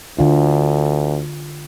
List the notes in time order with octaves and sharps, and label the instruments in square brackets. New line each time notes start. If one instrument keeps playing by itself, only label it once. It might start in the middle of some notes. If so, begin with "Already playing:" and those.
[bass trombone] D2 [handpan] D3 F4